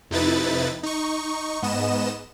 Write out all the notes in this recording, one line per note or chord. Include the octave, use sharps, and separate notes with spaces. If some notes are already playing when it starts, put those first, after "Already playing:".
F2 C3 D#4 E4 B4 A6
D#4 C#6
G#2 B3 D#5 E7